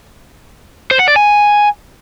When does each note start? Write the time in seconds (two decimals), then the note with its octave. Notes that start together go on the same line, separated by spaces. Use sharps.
0.91 C5
0.99 F#5
1.08 D5
1.16 G#5